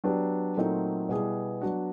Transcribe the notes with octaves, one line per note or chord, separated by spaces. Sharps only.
F#3 B3 D4 G4
A#2 F#3 A3 C4 D#4
B2 G3 B3 E4 G#4
F#3 B3 D4 F#4